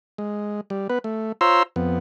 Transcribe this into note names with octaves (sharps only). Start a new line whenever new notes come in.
G#3
G3
B3 B4
A3
F4 C5 C#5 A#5 C6 E6
F2 B3